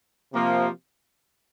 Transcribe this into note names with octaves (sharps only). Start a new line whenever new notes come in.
C3 F3 A#3